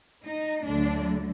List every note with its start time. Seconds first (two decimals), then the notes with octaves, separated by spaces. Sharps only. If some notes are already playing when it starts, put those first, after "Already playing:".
0.24 D#4
0.65 D2 D3 F#3 D4